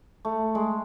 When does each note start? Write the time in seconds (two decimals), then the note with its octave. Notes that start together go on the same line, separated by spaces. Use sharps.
0.25 A3
0.55 G#3